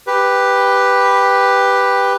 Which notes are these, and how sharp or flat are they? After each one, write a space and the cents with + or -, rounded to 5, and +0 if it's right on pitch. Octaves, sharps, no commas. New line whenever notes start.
G4 +5 B4 +0